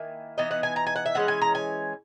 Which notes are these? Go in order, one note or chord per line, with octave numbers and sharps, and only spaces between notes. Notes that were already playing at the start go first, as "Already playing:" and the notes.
Already playing: D#3 A#3 E4 G#5
E3 B3 D#4 D#5
F#5
G#5
A#5
G#5
F#5
E5
E3 G#3 C#4 F#5
G#5
A#5
G#5